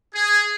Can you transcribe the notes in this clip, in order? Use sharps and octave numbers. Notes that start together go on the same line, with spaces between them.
G#4